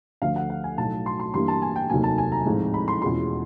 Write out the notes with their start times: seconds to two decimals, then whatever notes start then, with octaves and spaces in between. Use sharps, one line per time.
0.22 D2 D3 F3 A3 F5
0.36 F#5
0.50 F#5
0.64 G#5
0.78 B1 A2 F#3 A5
1.06 C6
1.20 C6
1.34 G2 E3 G3 A#3 D4 C6
1.48 A5
1.62 G#5
1.76 G5
1.90 F1 D#2 D#3 F#3 A#3 G#5
2.04 A5
2.18 G#5
2.32 A#5
2.46 A1 G#2 F3 G#3 C4
2.74 B5
2.88 C6
3.02 E2 B2 G#3 C#4 F4 C6